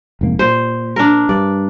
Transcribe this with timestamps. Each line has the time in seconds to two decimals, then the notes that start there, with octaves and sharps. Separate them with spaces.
0.21 F1 G#2 A#3
0.39 A#2 C5
0.96 D4 A#4
1.29 G2 D5